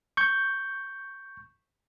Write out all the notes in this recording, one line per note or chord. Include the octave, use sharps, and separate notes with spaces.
C#6 G6